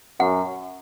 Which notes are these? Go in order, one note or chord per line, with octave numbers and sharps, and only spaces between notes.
F#2 F#5